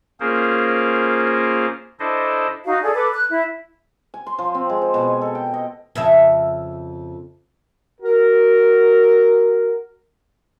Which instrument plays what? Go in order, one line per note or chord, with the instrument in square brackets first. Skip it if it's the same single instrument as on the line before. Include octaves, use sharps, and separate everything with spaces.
[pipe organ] A#3 C#4 F4 G#4 A#4 C5
D4 E4 A4 C5 D#5
[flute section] D#4 F#4 F5
G#4 A4 D5
A4 B4 D6
F#6
E4
[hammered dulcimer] G#5
C6
F3
C4
G#3
C5
B2
G#5
A4
G5
D#5
[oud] F2 C#3 E5
[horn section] F#4 A#4